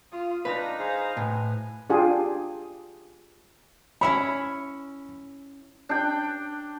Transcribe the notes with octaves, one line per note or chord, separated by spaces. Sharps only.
F4 D#6
D4 D#4 F4 B4 A#5
G#4 C5 F5
A2 B4 G#5
D4 F4 G4 G#4
C#4 E4 C#5 B5
D4 G5